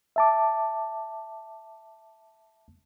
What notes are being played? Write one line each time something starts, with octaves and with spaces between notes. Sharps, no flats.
E5 A5 D6